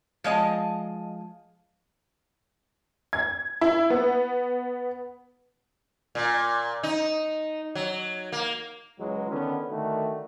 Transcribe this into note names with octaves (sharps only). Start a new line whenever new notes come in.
F3 G#3 D#5 A5
G#6
E4
B3
A#2
D#4
F#3
A#3
C#2 E3 F#3 G#3
D3 D#3 B3 C#4
D3 D#3 A3 F#4